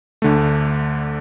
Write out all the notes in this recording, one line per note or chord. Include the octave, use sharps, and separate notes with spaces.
D2 D3 A3